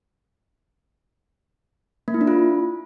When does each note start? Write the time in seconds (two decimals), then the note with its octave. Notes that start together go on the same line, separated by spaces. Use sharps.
2.08 A#3
2.14 E4
2.21 D4
2.27 F4